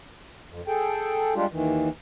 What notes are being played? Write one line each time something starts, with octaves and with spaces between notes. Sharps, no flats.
F2
G#4 A4 G5
G3 G#3 D4 F4 G4
D#2 D#3 E3